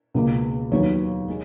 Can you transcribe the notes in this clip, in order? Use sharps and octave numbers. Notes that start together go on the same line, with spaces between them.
C#2 B2 A#3
D#2 D#3 F#3 B3 C#5
G#3